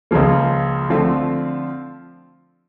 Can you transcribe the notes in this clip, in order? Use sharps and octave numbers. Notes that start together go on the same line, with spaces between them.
C#2 C#3 F3 A#3
D3 F3 A3 C4 F4